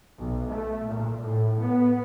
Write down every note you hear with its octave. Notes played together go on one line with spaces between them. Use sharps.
B1
A3
A#2
A2
B3